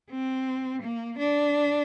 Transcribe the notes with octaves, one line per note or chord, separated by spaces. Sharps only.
C4
A#3
D4